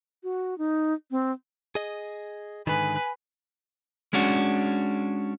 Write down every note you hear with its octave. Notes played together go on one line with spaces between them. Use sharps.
F#4
D#4
C4
G#4 D#5
G#2 D3 D#3 B4 G#5
G#3 C#4 D4 F#4